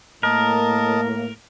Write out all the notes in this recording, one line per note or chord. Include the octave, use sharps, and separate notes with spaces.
A2 A#3 A#4 D#5 A5